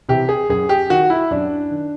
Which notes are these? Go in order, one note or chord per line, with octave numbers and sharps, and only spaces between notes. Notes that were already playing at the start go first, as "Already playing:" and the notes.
C3 E3 G4
G#4
F#2 G#4
G4
D#3 F#4
E4
F#2 D4
D#3